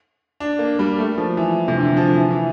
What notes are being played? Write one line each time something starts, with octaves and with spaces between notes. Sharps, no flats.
D4
A#3
G3
A3
F3
E3
C3
D3
F3
E3
E3